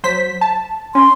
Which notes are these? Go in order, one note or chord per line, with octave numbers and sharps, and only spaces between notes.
F#3 C5 B6
A5
C#4 C6